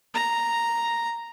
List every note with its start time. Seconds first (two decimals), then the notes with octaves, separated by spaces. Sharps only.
0.14 A#5